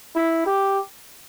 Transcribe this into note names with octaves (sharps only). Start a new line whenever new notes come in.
E4
G4